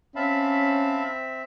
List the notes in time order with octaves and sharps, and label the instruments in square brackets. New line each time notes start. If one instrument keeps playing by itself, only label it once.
[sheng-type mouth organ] C4 E5 [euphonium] C#4 [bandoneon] F5 A5 B5